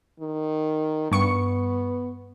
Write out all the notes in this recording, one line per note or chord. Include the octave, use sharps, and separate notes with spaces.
D#3
G2 B3 C#6 C#7